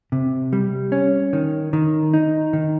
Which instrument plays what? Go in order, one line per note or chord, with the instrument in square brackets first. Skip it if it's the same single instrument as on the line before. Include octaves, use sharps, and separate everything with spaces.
[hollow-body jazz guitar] C3
G3
C#4
D#3
D#3
D#4
D#3